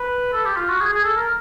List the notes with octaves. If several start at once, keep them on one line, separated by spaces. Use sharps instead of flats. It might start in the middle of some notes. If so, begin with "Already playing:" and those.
Already playing: B4
A4
G4
F4
F#4
G#4
G#4
A4
A#4